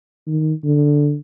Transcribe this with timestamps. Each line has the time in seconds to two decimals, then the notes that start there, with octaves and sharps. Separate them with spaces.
0.27 D#3
0.64 D3